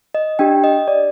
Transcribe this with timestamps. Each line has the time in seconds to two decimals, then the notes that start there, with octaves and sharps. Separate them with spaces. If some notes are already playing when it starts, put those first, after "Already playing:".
0.15 D#5
0.39 D4 G4 G5
0.64 D#5
0.88 D5